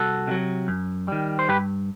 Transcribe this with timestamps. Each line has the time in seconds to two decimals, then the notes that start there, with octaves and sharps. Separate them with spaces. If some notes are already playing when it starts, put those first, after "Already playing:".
Already playing: C2 F#4 A4
0.27 C3 D#3 F#3
0.68 F#2
1.08 D#3 G3
1.39 C5
1.48 G2 G4 B4